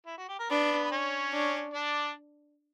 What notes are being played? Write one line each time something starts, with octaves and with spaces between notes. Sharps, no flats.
E4
F#4
G4
A#4
B3 D4 B4
B4
C#4 C#5
D4
D4 D5